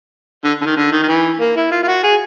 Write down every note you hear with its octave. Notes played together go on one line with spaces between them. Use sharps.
D3
D3
D#3
D3
D#3
D#3
E3
A#3
E4
F4
F4
F#4
G#4